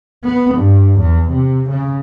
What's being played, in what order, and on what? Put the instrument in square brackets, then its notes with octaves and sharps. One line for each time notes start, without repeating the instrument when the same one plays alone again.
[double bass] B3
G2
E2
C3
C#3